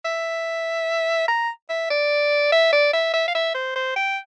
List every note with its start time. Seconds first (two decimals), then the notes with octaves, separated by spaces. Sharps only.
0.05 E5
1.28 A#5
1.69 E5
1.90 D5
2.52 E5
2.72 D5
2.93 E5
3.14 E5
3.28 F5
3.35 E5
3.55 C5
3.76 C5
3.96 G5